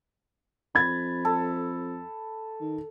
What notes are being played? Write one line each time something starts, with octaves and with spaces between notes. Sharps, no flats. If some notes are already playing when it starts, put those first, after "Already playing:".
F2 B5 G#6 A6
A4
D#3